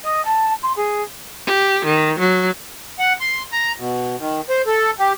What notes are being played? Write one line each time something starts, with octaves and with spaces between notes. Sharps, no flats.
D#5
A5
C6
G#4
G4
D#3
F#3
F#5
C6
A#5
B2
D#3
C5
A4
G4